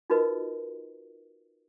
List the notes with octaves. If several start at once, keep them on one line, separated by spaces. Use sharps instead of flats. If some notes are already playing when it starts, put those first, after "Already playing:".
D#4 F4 F#4 A#4 B4 D#5